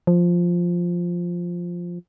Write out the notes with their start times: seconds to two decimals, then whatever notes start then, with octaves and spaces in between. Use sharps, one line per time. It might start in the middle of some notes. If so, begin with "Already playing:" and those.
0.07 F3